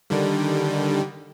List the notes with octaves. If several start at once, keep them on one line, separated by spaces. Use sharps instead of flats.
D3 D#3 G3